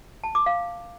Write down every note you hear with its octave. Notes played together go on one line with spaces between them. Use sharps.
A5
D6
F5